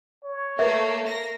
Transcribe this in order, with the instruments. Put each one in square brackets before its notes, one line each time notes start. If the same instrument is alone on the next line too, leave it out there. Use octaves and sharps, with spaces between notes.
[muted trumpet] C#5
[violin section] A3 A#3 [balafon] A#4 B4 [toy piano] E5
[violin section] A#3 A#6